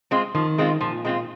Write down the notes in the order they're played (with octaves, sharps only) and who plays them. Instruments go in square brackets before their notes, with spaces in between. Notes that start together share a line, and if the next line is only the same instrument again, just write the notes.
[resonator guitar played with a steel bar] G#3 C4 F4
[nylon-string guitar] D#3 [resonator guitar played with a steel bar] F3
[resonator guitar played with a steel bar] G#3 C4 F4
[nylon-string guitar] A#2 [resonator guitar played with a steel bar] F3
[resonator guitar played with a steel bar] G#3 C4 F4